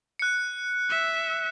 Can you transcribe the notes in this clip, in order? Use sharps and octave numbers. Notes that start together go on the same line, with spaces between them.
F#6 C#7
E5